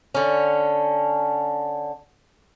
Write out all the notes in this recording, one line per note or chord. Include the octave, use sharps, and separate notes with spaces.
D3 C#4